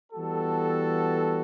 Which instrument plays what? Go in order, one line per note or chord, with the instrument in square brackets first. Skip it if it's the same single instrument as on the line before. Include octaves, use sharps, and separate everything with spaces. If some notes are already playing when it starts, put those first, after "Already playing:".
[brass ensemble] E3 G3 B3 F#4 A4